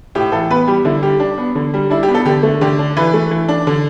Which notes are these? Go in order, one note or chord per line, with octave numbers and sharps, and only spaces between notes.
A2 G4
E3 A4
B3 B4
G3 G4
D3 E4
G3 G4
D4
B3
D3
G3
D4 E4
G4
B3
A4
D3 G4
A3
D3 G4
D4
E3 B4
A3
E3
D4
D3